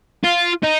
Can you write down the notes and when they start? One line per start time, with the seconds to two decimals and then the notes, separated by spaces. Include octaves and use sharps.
0.24 F4
0.63 D#4